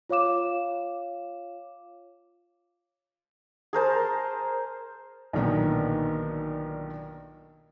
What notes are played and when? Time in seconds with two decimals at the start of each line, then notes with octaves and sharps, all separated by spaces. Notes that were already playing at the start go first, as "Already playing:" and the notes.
0.09 F4 C#5 F5 D6 E7
3.73 G#4 A#4 C5 A5
5.33 B1 A#2 D3 D#3 A#3 B3